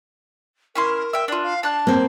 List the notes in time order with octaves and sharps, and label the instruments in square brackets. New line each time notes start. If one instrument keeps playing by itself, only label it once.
[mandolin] C#4 E4 C6 [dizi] A#4
[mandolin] E5 G5
D4 F4
[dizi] F5
[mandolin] D4 F#6 [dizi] A5
[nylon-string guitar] A#3 C4